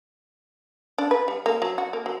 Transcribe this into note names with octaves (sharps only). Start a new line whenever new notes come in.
D4
B4
G3
A#3
F#3
F#4
A#3
F#3